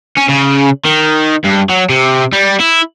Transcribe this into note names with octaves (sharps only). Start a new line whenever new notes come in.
C#4
C#3
D#3
G2
F#3
C3
G3
E4